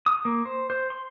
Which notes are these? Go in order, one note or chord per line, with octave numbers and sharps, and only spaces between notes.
D#6
A#3
C5
C5
C6